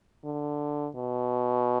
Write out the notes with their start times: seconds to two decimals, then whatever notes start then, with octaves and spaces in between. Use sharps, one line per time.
0.25 D3
0.95 B2